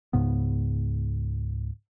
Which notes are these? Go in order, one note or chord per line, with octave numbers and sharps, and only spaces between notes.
C#2 G#2 C#3 B3